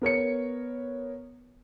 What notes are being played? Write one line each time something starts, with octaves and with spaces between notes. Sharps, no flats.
B3 A#4 C#5 C#7